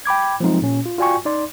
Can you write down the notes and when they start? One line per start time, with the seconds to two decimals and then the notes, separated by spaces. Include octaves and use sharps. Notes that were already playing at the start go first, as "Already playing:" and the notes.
0.06 G5 B5 D6 G#6
0.40 F3 F#3 G#3 C4 D#4 F4
0.62 A#2 C#4
0.86 F4
0.98 F4 F#4 D5 G5 G#5 C#6
1.25 D#4 D5 C6